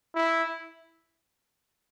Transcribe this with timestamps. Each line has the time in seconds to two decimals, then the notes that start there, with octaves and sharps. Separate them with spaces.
0.15 E4